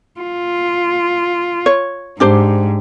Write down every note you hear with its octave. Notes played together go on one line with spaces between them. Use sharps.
F4
C#5
G#2 D4 G4 C5